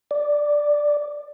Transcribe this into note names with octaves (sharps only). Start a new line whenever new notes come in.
D5